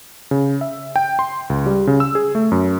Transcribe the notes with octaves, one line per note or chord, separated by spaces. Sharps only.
C#3
E5
G5
C6
C#2
G3
C#3
E6
G#4
A3
F#2